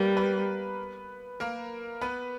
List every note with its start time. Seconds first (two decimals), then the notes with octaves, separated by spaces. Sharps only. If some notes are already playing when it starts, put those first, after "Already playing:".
Already playing: G3 A#3 B3 A#4 B4
0.16 B3 B4
1.40 A#3 A#4
2.01 B3 B4